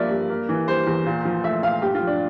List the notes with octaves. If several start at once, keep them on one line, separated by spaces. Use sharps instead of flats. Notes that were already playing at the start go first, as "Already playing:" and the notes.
Already playing: G2 F3 A#3 D5 E5
G2
A#3
E3
G3 C5
E2
A#2
F3
A3 E5
A#2 F5
G2 G4
F4
F3
D4